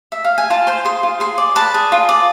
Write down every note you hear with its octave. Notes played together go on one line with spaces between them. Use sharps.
E5
F5
G#5
F4 A5
C5 C6
G#4 C6
F4
G#4 C6
D5
B4 A5
G#4
F4
D5